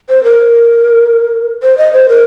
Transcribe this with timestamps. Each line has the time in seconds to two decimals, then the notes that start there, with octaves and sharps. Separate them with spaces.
0.09 C5
0.24 A#4
1.63 C5
1.78 D#5
1.93 C5
2.09 A#4